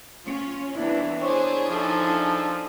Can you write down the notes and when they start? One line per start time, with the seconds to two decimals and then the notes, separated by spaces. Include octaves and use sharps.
0.24 C#4 F4 C#5
0.75 C2 E3 B3 D4 E4
1.22 D4 E4 G#4 C5 C#5
1.69 F3 D#4 A4